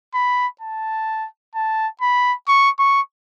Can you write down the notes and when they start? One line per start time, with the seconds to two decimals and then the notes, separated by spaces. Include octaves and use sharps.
0.14 B5
0.61 A5
1.55 A5
2.01 B5
2.48 C#6
2.79 C#6